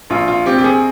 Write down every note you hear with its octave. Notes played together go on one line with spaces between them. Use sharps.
A#1 F4
F4
C4 G4
G4
G#4